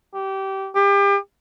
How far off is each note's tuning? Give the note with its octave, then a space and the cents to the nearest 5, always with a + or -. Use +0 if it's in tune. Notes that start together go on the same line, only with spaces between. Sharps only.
G4 -20
G4 +35